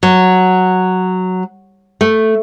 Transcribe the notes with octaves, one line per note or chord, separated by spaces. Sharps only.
F#3
A3